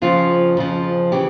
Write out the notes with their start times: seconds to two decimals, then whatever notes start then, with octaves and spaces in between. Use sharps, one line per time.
0.02 F2 C#3 F3 F4
0.57 F2 C#3 F3
1.12 C#3 E3 G4